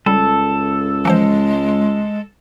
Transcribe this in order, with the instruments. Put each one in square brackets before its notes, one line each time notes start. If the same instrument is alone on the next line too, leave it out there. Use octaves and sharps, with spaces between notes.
[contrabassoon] C#2 [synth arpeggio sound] G3 [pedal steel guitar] A4
[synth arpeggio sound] E3 F3 C5 [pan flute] G#3